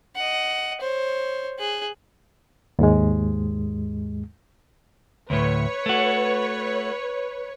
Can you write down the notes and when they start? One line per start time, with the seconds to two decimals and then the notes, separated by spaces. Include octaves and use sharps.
0.16 D#5 F#5
0.81 C5 C#5
1.59 G#4 F#6
2.79 D#2 G#2 G#3
5.30 D2 A2 B4 C#5
5.86 A3 F#4